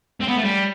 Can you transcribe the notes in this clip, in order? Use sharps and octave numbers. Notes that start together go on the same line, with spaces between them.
C4
B3
A3
G3